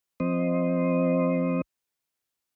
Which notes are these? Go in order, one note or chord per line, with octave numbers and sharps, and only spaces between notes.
F3 C4 C5 D#5